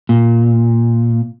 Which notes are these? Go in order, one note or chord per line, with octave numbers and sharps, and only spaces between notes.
A#2